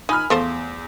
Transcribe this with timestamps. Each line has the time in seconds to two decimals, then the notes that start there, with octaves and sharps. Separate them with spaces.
0.09 D#4 G#5 B5 F6
0.30 E2 F3 A3 C5